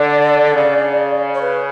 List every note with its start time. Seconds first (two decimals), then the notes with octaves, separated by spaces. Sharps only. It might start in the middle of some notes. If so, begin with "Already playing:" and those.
Already playing: D3 D5
0.54 C#3
1.34 C#5
1.41 B4